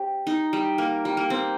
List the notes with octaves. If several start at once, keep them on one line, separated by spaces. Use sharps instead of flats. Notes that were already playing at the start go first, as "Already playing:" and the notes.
Already playing: C4 G4
D#4
G3
A#3
G3
A#3
C4